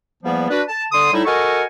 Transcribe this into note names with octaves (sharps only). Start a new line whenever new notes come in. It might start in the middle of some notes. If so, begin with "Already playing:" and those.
E2 F3 G3 A#3 B3
D4 F#4 B4
A5
D3 C6 D#6
A2 G3 D#4 E4
F#4 A4 A#4 D#5 G#5 C#6